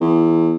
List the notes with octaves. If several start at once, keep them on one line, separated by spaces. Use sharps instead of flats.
E2